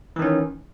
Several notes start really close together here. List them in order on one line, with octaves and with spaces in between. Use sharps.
E3 D#3 C#4